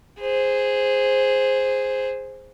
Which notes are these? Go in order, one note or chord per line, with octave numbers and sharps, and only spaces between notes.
G#4 C5